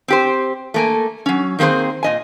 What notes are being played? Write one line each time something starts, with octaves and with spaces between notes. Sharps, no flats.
C4 G4 C5
A3 A#3 G#5
F#3 C#4
D#3 A#3 C4 G#4 C5
A#2 D#5 G#5